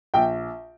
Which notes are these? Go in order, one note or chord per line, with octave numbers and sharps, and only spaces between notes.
A#1 G5